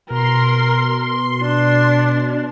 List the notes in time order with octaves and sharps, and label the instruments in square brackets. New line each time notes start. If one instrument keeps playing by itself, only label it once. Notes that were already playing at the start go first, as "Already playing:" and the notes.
[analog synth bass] B2 [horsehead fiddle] A#4 [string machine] C6
[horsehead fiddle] D4